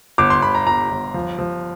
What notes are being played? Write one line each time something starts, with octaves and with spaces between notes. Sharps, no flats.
G1 D6
C6
G1 B5
A#5
G1 A#5
G1
F3
F3